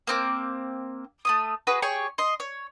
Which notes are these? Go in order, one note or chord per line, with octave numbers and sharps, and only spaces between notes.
A#3 C4 D6
A3 C#4 D#6
F#4 G#4 B4
G4 G#4 C#5 C#6
D#5 C6
C#5